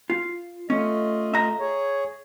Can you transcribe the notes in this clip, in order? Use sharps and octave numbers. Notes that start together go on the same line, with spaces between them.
F4
A3 C#4 F4 D#5
E5 A#5
G#4 C#5